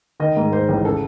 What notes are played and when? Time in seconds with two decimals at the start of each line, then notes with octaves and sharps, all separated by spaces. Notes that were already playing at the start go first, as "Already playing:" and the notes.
0.20 D#3 D#5
0.37 G#2
0.52 G#2 C5
0.69 A1
0.85 C#3 A4